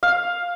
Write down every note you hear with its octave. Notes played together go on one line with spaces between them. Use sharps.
F5